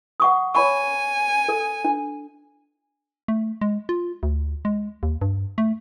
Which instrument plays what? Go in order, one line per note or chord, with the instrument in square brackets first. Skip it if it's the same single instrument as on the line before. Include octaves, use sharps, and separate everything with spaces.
[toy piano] F#5 C#6 D#6
[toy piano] C#5 B5 C#6 [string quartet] G#5
[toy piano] A4
D4
[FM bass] A3
G#3
F4
D2
G#3
D#2
G2
A3